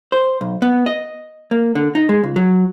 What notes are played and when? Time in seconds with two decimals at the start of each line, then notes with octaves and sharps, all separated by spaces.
0.12 C5
0.41 B1
0.62 B3
0.86 D#5
1.51 A#3
1.75 D3
1.95 D#4
2.09 G#3
2.23 C#2
2.36 F#3